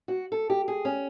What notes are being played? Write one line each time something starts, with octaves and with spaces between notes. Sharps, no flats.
F#4
A4
G4
G#4
C#4